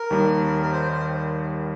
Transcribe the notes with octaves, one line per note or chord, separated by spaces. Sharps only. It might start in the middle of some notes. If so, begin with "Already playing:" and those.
Already playing: A#4
D#2 D#3 G3
A#4
C5
C5